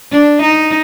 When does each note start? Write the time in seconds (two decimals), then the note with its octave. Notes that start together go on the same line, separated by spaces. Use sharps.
0.12 D4
0.42 D#4